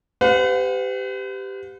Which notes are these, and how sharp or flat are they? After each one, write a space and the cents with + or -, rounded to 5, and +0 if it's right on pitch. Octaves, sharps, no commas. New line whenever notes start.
G4 +0 B4 +45 F#5 -45